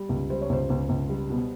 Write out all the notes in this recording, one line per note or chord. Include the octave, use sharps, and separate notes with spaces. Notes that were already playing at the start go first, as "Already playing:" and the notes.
Already playing: G3
C#2
G3 C5
C#5
C#2 C5
C#2
C#2
G3
B2